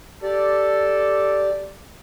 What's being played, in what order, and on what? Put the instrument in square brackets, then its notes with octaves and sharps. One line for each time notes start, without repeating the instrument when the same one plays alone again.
[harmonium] G4 D5 [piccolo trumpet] A4